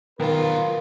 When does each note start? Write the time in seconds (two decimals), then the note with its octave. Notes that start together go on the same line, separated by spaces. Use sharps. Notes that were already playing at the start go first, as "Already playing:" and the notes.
0.20 B1 D#3 F4 A#4 B4